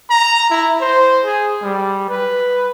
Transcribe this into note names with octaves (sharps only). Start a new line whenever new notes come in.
A#5
E4
C5
G#4
G3
B4